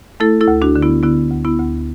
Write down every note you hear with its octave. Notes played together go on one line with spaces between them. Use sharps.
A3 E4 A4
E4 A4
D2
D4 F#4
D3
B3 E4
D3 B3 E4
D2
B3 E4
D2